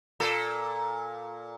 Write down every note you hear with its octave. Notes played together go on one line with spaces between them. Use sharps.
A#2 A4